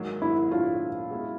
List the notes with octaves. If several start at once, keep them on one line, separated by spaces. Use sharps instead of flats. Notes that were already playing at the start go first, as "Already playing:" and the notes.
Already playing: G#2 D#3 F#3 A#3
E4
A#2 F#3 A3 D4 F4
B2 G#3 C#4 E4